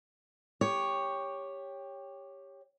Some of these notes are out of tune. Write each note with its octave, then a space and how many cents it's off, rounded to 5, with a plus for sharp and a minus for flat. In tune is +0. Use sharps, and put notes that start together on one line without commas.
G4 +15 C#5 +0